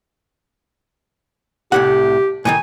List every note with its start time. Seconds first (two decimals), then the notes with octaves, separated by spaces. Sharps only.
1.72 C2 A2 G4 F#5
2.45 A2 C3 D#3 G#5